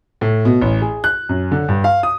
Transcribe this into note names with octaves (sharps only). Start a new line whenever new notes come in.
A2
B2
A1
G#4
F#6
F#2
D3
G2
F5
D#6